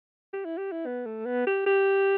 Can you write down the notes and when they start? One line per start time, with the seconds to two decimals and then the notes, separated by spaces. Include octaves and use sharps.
0.33 G4
0.45 E4
0.58 G4
0.72 E4
0.86 B3
1.06 A3
1.25 B3
1.47 G4
1.66 G4